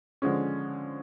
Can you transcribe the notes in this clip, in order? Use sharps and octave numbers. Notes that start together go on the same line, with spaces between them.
D3 F3 G#3 C#4